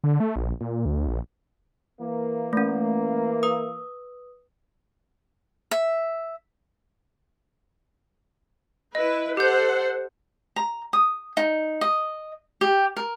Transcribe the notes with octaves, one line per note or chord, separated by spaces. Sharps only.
D3
A3
A#1
A#2
D2
A#1
E3 A#3
A3 C#4
B4 D#6
E5
E4 B4 D#5
G4 A4 C5 F#5 G6
A#5
D#6
D#4
D#5
G4
A#4